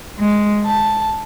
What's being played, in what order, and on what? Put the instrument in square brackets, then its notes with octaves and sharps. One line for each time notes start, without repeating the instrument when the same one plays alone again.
[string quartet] G#3
A5